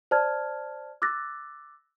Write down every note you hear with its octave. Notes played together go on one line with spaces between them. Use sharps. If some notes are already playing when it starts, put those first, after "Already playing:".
C5 D5 A5 F6 G#6
D6 E6 F#6 A6 A#6